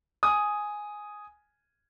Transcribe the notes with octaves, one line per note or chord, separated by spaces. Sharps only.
G#5 D#6